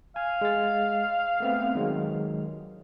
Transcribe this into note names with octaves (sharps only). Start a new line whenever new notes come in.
F5 G#5
G#3 A6
A3 B3 C4
D#3 F#3 G#3